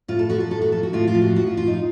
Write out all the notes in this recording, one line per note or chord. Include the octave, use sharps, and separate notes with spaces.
A2 F4
A4
F3 F#4
A4
A2 A4
F#4
F3 A4
F#4
A2 F4
F4
F3
F#4
A2 F#4
F4
F3 F4
D#4